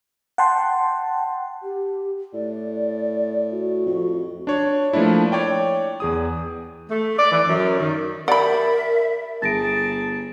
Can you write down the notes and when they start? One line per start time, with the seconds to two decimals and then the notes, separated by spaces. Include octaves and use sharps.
0.38 F#5 G5 A5 C6
1.63 G4
2.34 A2 D5
3.51 F#4
3.86 F2
4.47 D4 C#5
4.93 F3 A3 A#3 D4 E4
5.32 C#5 D5 G5
6.00 E2 G#4 D#6
6.90 A3
7.18 D5
7.32 E3
7.47 F#2
7.79 D#3
8.28 G4 A#4 D5 E5 F#5 B5
9.42 G1 G#4 A5 A6 A#6 D7